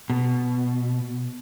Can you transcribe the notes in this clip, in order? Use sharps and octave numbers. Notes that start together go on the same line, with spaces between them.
B2